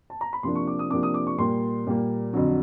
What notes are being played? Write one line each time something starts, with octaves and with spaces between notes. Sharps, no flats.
A5
A#5
B5
C3 F3 A#3 D4 C6
C#6
D6
D#6
C3 F3 A#3 D4 D6
D#6
D6
C#6
A#2 G3 A#3 C6
A#2 G3 A#3
F2 D3 F#3